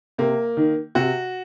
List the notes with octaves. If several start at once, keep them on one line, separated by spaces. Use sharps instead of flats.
C3 A#3
D#3
C3 F#4